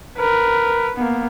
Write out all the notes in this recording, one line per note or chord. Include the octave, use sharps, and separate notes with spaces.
A#4 B4
A#3 B3